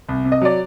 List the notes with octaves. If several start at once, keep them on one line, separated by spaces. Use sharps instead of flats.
C2
C3
D#5
F#3 D5